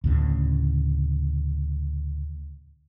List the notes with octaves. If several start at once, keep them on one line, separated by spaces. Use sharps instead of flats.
D2 A2 C#3